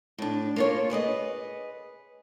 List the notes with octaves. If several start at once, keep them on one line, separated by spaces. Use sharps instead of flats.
A2 D4
A#3 F4 C#5
G#4 B4 D5 D#5